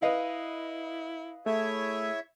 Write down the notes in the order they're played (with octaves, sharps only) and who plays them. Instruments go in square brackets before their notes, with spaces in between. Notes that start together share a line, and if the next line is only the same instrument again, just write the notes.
[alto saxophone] E4 [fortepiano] B4 D#5 F5
[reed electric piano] A3 [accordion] E4 C#5 E5 [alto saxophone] G#4